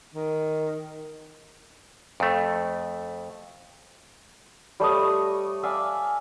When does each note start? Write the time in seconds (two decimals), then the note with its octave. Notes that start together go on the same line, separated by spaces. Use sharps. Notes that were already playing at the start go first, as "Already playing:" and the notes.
0.14 D#3
2.20 F2 A3
4.80 G3 A3 C#5 D#5
5.63 D5 E5 F5 G#5